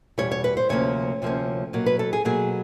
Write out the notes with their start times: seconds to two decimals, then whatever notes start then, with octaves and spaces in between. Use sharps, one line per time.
0.18 E2 B2 G3 C#5
0.31 C#5
0.44 B4
0.57 C5
0.69 D2 C3 F3 A#3 C#4 C#5
1.22 D2 C3 F3 A#3 C#4
1.73 B2 F#3 A#3
1.86 B4
1.99 A4
2.13 G#4
2.25 B2 F#3 A#3 G#4